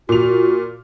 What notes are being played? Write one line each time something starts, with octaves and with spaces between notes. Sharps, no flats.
A#2 F#4 F7